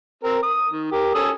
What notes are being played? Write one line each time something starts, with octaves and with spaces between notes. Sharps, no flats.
C4 A#4
D#6
D#3
G4 A#4
C#4 A4 D#6